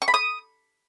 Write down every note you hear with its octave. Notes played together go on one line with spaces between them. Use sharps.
C#6
B5
D#6